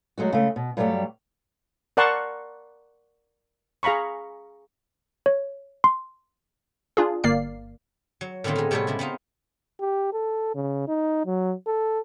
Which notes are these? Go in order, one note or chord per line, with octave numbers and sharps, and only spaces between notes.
F#3 G#3 A3 F#4
C#3 G#3 A3
B2
G2 F#3 G3 A3 G4
A#4 D5 F#5 A5 C6 C#6
G#4 F5 A#5 B5 C#6
C#5
C6
D4 F4 G#4
G1 A#3 D5 F5 C7
F#3
A2 D3 D#3 B3 C4 F4
G#3 D#4
A2 C3 G3 B3 A4 C#5
C#3 G#3 B3 E4
B3 C4 D#4 F4
G4
A4
C#3
D#4
F#3
A4